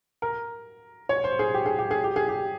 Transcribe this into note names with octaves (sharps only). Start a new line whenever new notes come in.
A#4
C#5
C5
G#4
G4
G#4
G4
G#4
G4
G#4
G4